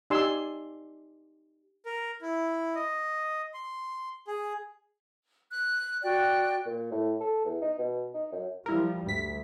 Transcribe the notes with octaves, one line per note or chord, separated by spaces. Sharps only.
D#4 G4 D5 G#5 C6 E6
A#4
E4
D#5
C6
G#4
F#6
F#4 D5 G5 F#6
A#2
A2
A4
E2
D#4
B2
D#4
F#2
F3 G3 E4 A#4
D2 G2 B6